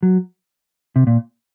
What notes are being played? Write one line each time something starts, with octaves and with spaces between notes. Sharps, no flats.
F#3
C3
A#2